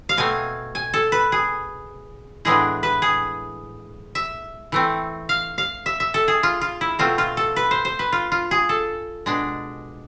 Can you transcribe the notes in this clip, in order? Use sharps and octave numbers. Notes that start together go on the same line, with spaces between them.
F5
B2 A3 C4 G#5
G#5
A4
B4
G#4
A2 E3 G#3 B3 D4 G#4
B4
G#4
E5
E3 A3 C4
F5
F5
E5
E5
A4
G#4
F4
F4
E4
B2 A3 C4 F4
F4
A4
B4
C5
C5
B4
F4
F4
G#4
A4
B2 G#3 D4